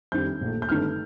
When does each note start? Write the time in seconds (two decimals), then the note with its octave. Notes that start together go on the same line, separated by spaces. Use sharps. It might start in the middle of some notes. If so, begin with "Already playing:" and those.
0.12 F2 D#3 G3 G6
0.41 A#1 A#2 A3
0.62 G6
0.69 G1 G2 D#3 A3 F6